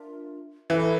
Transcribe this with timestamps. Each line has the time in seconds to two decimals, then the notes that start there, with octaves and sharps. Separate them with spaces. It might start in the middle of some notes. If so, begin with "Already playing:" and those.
Already playing: D4 F4 A#4 E5
0.70 E3 E4 A4 E5